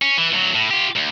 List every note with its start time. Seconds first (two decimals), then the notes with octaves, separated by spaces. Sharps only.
0.02 C#4
0.18 E3
0.33 D2 F#3
0.55 A2
0.71 F4 G4
0.96 D2